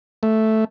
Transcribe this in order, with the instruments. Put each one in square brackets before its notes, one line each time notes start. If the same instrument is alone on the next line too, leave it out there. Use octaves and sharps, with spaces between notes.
[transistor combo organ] A3